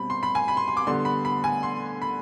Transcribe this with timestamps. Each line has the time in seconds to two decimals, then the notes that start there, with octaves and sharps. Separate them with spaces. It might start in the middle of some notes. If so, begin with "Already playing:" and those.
Already playing: B2 G3 C4 B5
0.10 C6
0.23 B5
0.35 G#5
0.48 B5
0.57 C6
0.68 C6
0.77 D6
0.87 D3 G3 B3 C6
1.05 B5
1.25 B5
1.44 G#5
1.63 C6
2.02 B5